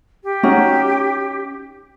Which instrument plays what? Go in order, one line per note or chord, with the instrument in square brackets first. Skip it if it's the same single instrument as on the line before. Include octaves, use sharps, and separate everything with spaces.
[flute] G4
[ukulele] C#4 D#4 F#4